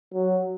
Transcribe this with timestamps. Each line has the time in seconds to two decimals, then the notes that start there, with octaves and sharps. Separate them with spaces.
0.14 F#3